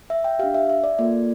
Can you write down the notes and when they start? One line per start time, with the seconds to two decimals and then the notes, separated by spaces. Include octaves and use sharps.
0.10 E5
0.24 G5
0.39 D4 G4 F5
0.54 E5
0.69 E5
0.84 D5
0.99 A#3 F4 A4 D5